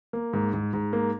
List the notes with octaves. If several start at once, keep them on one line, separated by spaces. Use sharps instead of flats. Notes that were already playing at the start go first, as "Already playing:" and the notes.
A#3
G#2
G#2
G#2
A#3